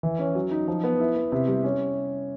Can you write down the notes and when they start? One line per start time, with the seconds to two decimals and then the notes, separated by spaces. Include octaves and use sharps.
0.03 E3
0.19 C#4
0.35 F#3
0.51 D#4
0.68 F3
0.84 B3
1.00 E4
1.16 B3
1.32 C3
1.48 G3
1.64 C#4